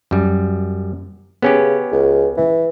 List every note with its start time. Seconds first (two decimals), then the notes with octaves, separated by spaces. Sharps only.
0.11 F#2 G3
1.42 C#3 B3 C#4 G4
1.92 C#2
2.37 E3